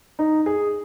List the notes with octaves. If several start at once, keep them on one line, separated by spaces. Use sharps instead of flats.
D#4
G#4